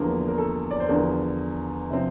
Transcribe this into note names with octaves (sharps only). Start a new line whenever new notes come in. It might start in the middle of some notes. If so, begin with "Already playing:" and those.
Already playing: E2 D3 F3 A#3 A#4
A#4
A4
D5
C5
E2 D3 F3 A#4
C3 F3 C4